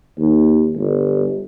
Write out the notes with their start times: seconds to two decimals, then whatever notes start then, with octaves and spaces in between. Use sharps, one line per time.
0.19 D#2
0.76 G1